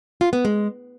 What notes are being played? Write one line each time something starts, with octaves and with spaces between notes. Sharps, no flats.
F4
B3
G#3